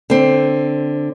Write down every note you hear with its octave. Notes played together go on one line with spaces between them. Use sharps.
D3 C4